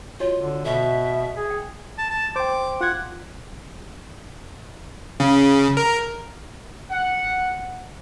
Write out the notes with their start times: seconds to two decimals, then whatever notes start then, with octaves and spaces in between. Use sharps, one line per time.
0.20 F4 F#4 C#5 D#5
0.40 D3
0.65 B2 E5
1.37 G#4
1.50 G5
1.98 A5
2.10 A5
2.36 C5 G5 D6
2.81 F4 F#5 G#6
5.20 C#3
5.77 A#4
6.91 F#5